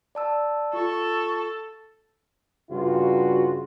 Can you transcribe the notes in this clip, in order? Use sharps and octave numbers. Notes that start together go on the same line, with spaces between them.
D5 A5 E6
F4 A4 C#6
G2 C#3 F4 F#4